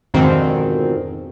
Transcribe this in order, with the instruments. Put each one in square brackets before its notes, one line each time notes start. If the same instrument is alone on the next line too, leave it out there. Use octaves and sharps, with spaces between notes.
[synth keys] F2 G#2 B2 D3 D#3 C4